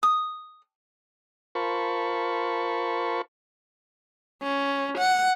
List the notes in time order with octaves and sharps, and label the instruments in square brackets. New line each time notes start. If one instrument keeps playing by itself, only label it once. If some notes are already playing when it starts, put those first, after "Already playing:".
[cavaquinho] D#6
[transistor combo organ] F4 A#4 C5 A5 B5 C#6
[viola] C#4
F#5